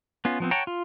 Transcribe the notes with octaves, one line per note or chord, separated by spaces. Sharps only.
B3 C#4 F4
F3 B3 C4
C#5 F#5 G5 A5 A#5
F4